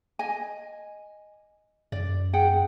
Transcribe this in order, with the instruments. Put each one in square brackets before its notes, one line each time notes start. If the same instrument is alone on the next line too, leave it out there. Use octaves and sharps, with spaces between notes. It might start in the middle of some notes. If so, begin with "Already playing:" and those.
[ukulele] D#5 G#5
[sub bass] F#2 [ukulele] D5
[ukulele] G#4 F#5 G5